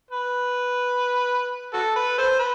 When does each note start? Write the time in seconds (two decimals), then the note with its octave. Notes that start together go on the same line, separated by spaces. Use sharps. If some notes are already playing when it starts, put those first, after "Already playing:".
0.11 B4
1.74 F#4 A4
1.96 B4
2.18 A4 C5
2.39 B4